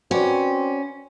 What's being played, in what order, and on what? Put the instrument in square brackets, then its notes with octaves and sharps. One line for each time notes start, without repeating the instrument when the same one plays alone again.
[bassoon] C4 [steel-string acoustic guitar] C#4 [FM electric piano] F#4 B4 D5